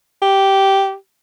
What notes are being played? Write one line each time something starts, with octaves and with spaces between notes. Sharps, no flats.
G4